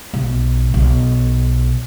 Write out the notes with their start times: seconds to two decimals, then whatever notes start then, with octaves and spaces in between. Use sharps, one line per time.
0.14 B1
0.74 B1